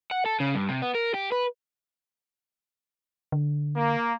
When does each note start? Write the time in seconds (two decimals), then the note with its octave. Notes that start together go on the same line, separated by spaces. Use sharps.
0.11 F#5
0.26 A4
0.40 C#3
0.55 G2
0.69 C3
0.82 B3
0.95 A#4
1.14 G4
1.32 B4
3.32 D3
3.75 A#3